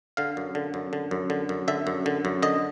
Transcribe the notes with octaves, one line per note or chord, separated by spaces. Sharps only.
D3 F5
F#2
D3
F#2
D3
F#2
D3
F#2
D3 E5
F#2
D3
F#2
D3 D#5